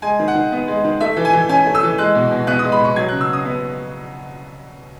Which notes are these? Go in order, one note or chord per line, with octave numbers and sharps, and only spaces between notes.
G#3 G#5
D#3
F#5
D#3
B3
G#3
D#3
A3 E5
E3
G#5
E3
C#4 G#5
A3
E6
E3
G#3 F#6
B2
B2
B3 F#6
D#6
G#3
B5
B2 C#6
F#3 G#6
C#3 F#6
E6
C#3 D#6
B3